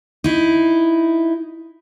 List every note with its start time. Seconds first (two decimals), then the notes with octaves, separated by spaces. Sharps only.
0.24 D#4 E4